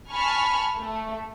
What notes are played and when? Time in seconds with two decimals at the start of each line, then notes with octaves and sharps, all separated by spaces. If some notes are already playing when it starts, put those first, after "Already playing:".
0.11 G#5 A5 B5 C#6 F6
0.76 A3